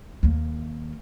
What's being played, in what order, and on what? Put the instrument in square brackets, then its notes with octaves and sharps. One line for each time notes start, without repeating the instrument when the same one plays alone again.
[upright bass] D#2 A#3